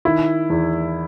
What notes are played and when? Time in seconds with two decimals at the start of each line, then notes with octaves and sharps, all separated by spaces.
0.05 D#3 E4
0.50 E2